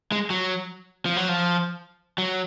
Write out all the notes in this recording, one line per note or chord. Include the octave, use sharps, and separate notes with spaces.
G#3
F#3
F3
F#3
F3
F#3